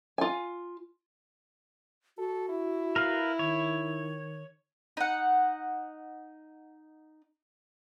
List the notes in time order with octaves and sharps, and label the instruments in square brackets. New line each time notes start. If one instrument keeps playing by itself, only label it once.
[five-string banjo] F4 G#5
[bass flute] F#4 [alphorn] A4
[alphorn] E4
[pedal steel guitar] A#4 B4 F5
[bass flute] D#3 [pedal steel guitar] C#5
[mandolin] D#4 F#5